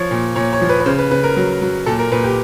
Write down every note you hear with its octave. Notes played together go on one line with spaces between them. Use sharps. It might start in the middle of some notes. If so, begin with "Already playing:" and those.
Already playing: F3 C#5
A#2
A#2 C#5
C#5
F3
B4
B4
C#3 C5
B4
C#3 B4
A#4
F#3
F#3
A#2 A4
A#4
A#2 B4
G4